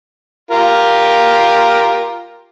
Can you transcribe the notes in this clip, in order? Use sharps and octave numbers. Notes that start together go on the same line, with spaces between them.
F4 G4 A#4